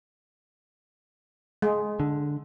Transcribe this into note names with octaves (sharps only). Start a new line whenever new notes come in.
G#3
D3